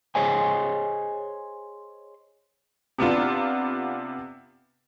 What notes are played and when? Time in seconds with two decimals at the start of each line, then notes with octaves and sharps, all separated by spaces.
0.15 G#4 C5 C#5 D#5 G#5
2.98 C3 B3 D4 F4